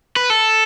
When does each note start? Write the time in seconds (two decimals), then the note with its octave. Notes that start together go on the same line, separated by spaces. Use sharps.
0.16 B4
0.30 A4